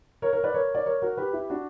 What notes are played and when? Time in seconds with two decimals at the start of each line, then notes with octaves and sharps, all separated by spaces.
0.22 A#4 C#5
0.32 A#4 C#5
0.44 B4 D5
0.54 A#4 C#5
0.75 D5
0.86 A#4 C#5
1.02 F#4 A#4
1.17 G4 B4
1.33 E4 G4
1.50 D4 F#4